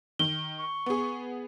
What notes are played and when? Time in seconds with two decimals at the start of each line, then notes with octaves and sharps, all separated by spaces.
0.19 D#3 G7
0.59 C#6
0.86 B3 G#4